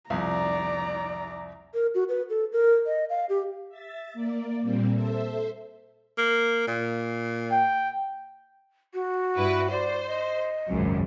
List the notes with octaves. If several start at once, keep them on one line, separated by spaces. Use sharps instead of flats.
C2 F2 D5 A#5
A#4
F#4
B4
A4
A#4
D#5
F5
G4
E5 A6
A#3 D5
A#2 G3 A#3 C4
A4 C5 E5
A#3
A#2
G5
F#4
G2 E4 B4
C5 D5
D#5
G#1 C#2 F#2